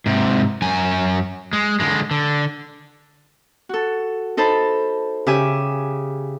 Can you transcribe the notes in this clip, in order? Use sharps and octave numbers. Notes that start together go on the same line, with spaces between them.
G#2 C3
F#2 G#5
G#3
D3 G#3
D3
F#4 A4
D#4 A4 C5 A5 B5
C#3 G4 E5 G#5